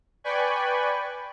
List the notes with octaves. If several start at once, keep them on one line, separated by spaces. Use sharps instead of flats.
B4 D5 G5 G#5 B5 C#6